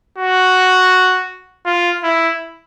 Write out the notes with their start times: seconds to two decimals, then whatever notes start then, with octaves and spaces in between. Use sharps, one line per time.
0.18 F#4
1.65 F4
2.04 E4